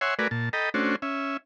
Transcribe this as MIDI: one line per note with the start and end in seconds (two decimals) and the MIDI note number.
0.01 0.14 73
0.01 0.14 76
0.01 0.14 78
0.01 0.14 80
0.01 0.14 84
0.19 0.28 57
0.19 0.28 66
0.19 0.28 70
0.19 0.28 71
0.19 0.28 74
0.19 0.28 80
0.31 0.49 46
0.31 0.49 81
0.53 0.69 69
0.53 0.69 75
0.53 0.69 79
0.53 0.69 82
0.53 0.69 83
0.74 0.96 57
0.74 0.96 61
0.74 0.96 62
0.74 0.96 66
0.74 0.96 72
1.02 1.37 61
1.02 1.37 76